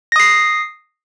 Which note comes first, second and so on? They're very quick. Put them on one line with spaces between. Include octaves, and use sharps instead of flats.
A#6 D#6 C7